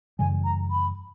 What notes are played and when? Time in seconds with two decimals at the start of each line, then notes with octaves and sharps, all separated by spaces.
0.19 F#2 C#3 E3 G3 G#5
0.44 A#5
0.70 B5